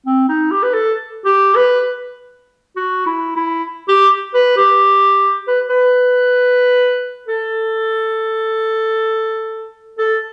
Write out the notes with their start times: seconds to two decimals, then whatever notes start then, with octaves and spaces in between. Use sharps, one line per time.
0.06 C4
0.29 D#4
0.51 G4
0.63 B4
0.74 A4
1.25 G4
1.56 B4
2.76 F#4
3.06 E4
3.36 E4
3.89 G4
4.34 B4
4.57 G4
5.48 B4
5.70 B4
7.28 A4
9.98 A4